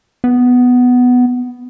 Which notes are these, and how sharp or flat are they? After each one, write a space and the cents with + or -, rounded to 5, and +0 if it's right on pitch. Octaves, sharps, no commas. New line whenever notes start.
B3 +5